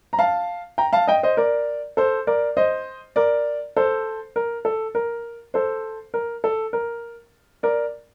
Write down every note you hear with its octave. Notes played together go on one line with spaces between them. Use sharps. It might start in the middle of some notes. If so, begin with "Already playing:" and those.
A#5
F5 A5
G5 A#5
F5 A5
D#5 G5
C5 D#5
A#4 D5
A4 C5
A#4 D5
C5 D#5
A#4 D5
A4 C5
A#4
A4
A#4
A4 C5
A#4
A4
A#4
A#4 D5